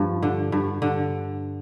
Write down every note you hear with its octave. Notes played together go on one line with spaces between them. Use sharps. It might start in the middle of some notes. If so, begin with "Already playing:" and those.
Already playing: G2 F3
D3
G2
D3